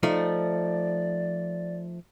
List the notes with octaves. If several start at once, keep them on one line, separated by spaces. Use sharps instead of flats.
F3 A3 D#4 D5